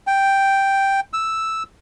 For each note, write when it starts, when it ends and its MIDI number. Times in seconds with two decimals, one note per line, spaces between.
0.07 1.00 79
1.13 1.63 88